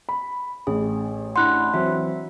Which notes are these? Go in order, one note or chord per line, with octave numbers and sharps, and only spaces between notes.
B5
A1 G#4
D4 E4 F#5 C6 F#6
E3 F#3 C4 E5